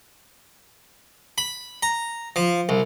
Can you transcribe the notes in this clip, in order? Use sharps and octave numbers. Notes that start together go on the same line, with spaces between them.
B5
A#5
F3
C2